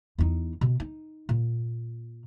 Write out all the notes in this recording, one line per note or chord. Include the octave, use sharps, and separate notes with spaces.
E2 D#4
B2
D#4
A#2